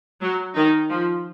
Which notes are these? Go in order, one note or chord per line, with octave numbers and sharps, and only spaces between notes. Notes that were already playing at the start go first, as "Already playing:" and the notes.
F#3
D#3 D#4
F3